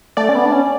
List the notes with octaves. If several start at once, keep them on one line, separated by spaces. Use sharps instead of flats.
A3 D5
C#4
B3
D4
C#4